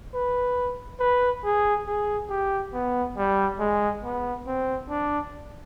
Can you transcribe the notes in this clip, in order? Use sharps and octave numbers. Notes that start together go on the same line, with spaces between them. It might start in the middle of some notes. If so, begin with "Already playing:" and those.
B4
B4
G#4
G#4
G4
B3
G3
G#3
B3
C4
D4